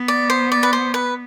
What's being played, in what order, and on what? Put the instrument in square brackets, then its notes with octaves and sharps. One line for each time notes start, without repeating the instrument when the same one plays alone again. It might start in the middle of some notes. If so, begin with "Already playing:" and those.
Already playing: [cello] B3
[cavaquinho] D5
C5
D5
B4
C5
B4